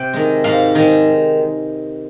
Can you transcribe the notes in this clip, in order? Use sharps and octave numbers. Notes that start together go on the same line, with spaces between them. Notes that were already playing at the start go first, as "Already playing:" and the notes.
Already playing: C3 G5
D#3 G#3
G#2 F5
D#3 G#3